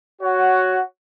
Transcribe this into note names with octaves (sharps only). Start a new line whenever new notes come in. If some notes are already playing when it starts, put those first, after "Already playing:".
F#4 C#5 F#5